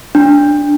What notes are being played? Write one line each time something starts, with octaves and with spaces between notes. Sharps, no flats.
D4